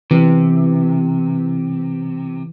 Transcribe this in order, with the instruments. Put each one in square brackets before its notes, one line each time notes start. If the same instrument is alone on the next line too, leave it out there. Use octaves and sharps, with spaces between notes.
[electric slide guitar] C3 [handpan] E3